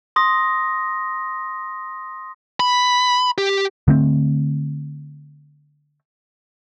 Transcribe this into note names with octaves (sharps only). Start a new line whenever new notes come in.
C6 D#6 A#6
B5
G4
D3 A3 C4